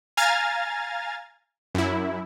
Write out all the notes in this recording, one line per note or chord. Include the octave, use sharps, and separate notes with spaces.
F5 G#5 A#5 F6 G#6 A6
F#2 E4